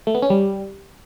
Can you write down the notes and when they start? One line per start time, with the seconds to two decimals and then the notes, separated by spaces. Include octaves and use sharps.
0.07 A3
0.15 B3
0.22 C#4
0.30 G3